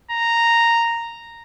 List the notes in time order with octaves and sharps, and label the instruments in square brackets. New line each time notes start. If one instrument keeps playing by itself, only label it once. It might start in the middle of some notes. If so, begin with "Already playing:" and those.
[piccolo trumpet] A#5